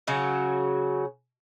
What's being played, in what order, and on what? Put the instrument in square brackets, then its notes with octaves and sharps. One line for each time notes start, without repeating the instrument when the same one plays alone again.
[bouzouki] C#3 F#3 F#4